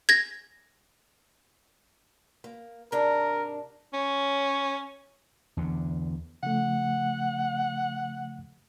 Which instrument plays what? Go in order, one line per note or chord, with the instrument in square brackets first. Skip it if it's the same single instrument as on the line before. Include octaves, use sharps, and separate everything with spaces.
[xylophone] G#6 A#6
[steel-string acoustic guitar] A#3
[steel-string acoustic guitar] G#2 C3 D4 [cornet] A#4
[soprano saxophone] C#4
[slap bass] E2 D3
[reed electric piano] C#3 F3 A3 [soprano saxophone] F#5